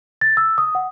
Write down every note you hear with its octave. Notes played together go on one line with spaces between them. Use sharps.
A6
E6
D#6
F#5